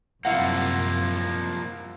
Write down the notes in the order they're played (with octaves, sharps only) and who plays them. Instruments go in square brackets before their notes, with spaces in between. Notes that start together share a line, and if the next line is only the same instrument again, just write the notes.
[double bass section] F#2 C3 [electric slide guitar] F3 G3 A#3 [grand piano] E4 F5 F#5